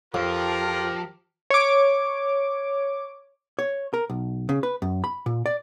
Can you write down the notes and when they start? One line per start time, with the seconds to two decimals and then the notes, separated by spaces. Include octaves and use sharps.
0.14 F2 F3 F4 G4 A#4
1.50 C#5 D6
3.59 C#5
3.94 A#4
4.10 B1
4.49 C#3
4.63 B4
4.82 F#2
5.04 B5
5.26 A#2
5.46 D5